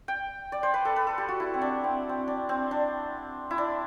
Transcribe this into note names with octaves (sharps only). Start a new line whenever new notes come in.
G5
D5
C5
B4
A4
B4
A4
G4
F#4
E4
C4
D4
C4
C4
D4
C4
D4
E4
D4